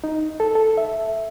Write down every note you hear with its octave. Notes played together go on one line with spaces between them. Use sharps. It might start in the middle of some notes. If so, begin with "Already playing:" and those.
D#4
A4
A4
E5